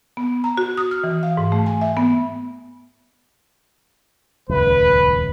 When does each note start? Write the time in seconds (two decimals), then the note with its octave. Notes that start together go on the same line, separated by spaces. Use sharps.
0.17 B3
0.44 A#5
0.58 F#4
0.77 D#6
0.91 F6
1.04 E3
1.23 F5
1.37 G#2
1.52 A3
1.66 G#5
1.81 E5
1.97 B3
4.49 D#1 C#2 F#2 B4